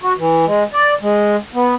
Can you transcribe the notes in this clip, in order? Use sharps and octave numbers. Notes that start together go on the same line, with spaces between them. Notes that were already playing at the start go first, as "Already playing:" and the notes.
F#4
E3
G#3
D5
G#3
B3